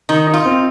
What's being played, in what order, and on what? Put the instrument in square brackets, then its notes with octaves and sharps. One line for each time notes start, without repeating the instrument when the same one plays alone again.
[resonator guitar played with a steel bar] D#3 [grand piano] D#4
[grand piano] D#4
[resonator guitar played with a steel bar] F4
[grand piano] C4